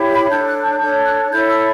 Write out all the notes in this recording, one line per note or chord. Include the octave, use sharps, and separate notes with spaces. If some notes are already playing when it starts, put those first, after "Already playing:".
Already playing: E4 G4 C#5
B5
D4 A4 C#5 G6
F#6
G6
D4 A4 C#5 G6
F#6
E4 A4 C#5 G6
E6